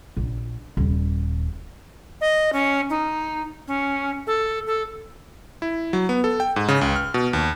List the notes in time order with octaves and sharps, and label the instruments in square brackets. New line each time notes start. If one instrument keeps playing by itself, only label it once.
[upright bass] A#1
D#1
[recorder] D#5
C#4
D#4
C#4
A4
A4
[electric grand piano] E4
F#3
B3
A4
G5
G#2
C#3
C#2
F6
B2
D#2